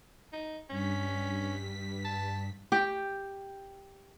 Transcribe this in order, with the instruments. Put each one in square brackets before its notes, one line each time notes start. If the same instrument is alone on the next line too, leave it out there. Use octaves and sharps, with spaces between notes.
[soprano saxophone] D#4
[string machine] G2 B6 [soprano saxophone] C#4
[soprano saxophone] A5
[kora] G4 G5